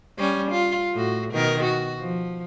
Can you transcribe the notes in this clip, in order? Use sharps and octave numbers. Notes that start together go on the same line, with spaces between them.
G3 C#4
F4
A2 F#4
B2 D#3 A#4
F#4
F3